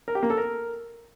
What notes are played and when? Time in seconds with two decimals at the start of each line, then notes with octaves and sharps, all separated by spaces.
0.08 A#4
0.15 G4
0.23 A#3
0.30 A4
0.38 A#4